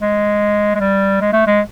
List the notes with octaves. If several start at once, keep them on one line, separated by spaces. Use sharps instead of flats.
G#3
G#3
G3
G#3
A3
G#3